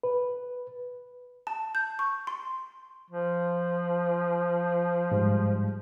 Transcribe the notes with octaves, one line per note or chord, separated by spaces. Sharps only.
B4
A5
G6
C#6
C6
F3
G#2 G3 G#3